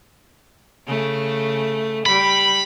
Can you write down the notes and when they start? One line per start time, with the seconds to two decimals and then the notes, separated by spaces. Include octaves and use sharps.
0.87 C#3 A3
2.06 G3 B5